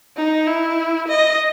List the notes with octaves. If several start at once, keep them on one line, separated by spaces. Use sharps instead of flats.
D#4
E4
D#5